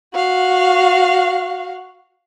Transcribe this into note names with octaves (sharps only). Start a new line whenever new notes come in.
F#4 F5